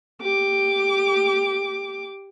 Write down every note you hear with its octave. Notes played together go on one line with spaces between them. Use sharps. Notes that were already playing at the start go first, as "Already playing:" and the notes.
G4 D6